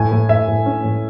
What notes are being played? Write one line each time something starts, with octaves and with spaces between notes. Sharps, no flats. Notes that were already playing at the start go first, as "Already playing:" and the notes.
Already playing: A2 G#5
A2
A2 E5
A2
C#4
A2